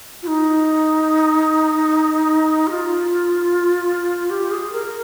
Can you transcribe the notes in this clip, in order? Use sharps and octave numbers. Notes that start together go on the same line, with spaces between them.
F4
D#4
G4
F4
G4
G#4
A#4